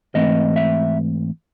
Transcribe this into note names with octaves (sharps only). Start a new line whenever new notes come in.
G#2 E3 A3 C4 D#5
E5